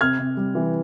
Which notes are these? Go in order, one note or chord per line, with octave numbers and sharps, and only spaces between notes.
C3 F6 G#6
C3
G3
E3